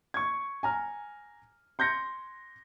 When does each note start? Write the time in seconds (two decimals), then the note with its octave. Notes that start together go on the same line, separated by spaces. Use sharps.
0.14 C#6 G#6
0.63 G#5 A#5 F6
1.79 C6 G6 G#6 A#6 C#7